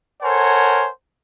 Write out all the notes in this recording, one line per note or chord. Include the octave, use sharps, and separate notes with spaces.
A4 A#4 C5 C#5 F#5 G#5